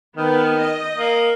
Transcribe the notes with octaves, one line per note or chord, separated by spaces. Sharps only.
D#3 B3
D#5
A#3